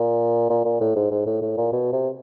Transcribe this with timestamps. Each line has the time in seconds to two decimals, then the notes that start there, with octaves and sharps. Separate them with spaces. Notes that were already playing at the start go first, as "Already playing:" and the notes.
Already playing: A#2
0.50 A#2
0.65 A#2
0.81 A2
0.96 G#2
1.11 G#2
1.26 A2
1.42 A2
1.57 A#2
1.73 B2
1.93 C3